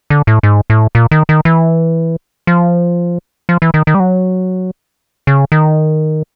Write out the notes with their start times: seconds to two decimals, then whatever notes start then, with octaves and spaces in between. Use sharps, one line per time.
0.10 D3
0.27 A2
0.43 G#2
0.70 A2
0.95 A#2
1.11 D#3
1.29 D#3
1.45 E3
2.47 F3
3.49 F3
3.62 E3
3.74 D#3
3.87 D#3
3.94 G3
4.00 F#3
5.27 C#3
5.52 D#3